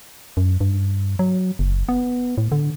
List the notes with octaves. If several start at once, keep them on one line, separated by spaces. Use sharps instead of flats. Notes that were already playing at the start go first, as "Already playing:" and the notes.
F#2
G2
F#3
F#1
B3
A2
D3